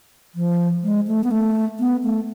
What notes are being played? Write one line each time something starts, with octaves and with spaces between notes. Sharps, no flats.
F3
G#3
A3
B3
A3
B3
A3